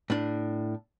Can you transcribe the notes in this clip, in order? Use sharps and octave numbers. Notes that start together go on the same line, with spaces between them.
A2 D4